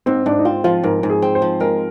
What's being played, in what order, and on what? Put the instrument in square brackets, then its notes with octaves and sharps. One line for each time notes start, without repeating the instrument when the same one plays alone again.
[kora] G#2 [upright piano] C4
[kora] G#2 [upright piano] D4
[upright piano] D#4
[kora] C4 [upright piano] F4
[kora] F3 [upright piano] F4
[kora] G#2 [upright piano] A#4
[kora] G#2
[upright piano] G#4
[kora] C4
[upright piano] C5
[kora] F3
[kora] G#3 [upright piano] A#4